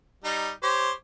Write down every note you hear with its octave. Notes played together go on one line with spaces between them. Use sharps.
G3 D#4
G4 C5 C#5